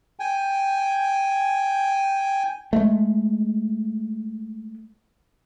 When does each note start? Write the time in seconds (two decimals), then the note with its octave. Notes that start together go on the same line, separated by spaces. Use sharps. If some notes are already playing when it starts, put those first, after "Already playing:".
0.20 G5 G#5
2.73 G#3 A3